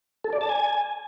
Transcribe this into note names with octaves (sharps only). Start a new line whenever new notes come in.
A4
D5
A5
G#5